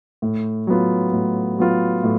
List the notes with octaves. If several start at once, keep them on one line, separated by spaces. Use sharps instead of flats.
A2
F#3 B3 F4
A2
F#3 B3 F4
A2